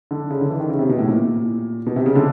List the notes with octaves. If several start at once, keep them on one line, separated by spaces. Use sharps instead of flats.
D3
C#3
D3
E3
D#3
C#3
C3
B2
A2
A#2
B2
C3
C#3
D3